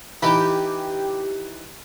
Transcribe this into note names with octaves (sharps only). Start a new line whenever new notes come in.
E3 D#4 G4 B5